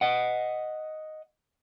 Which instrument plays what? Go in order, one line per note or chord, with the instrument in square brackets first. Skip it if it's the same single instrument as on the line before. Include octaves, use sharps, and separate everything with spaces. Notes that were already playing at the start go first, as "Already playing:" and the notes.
[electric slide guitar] D#5 F#5